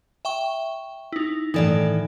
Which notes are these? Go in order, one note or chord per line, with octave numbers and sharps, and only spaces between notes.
E5 G5 C#6
D#4 E4
A2 D#3 E3 D#4 A4 D5